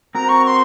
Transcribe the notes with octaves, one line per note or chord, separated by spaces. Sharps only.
C4 F#4 A#4 A#5
C#6
C#6
C6